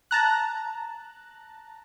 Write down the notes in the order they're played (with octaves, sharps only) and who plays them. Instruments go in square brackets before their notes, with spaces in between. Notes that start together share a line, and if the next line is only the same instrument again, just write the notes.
[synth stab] A5 A#5 F#6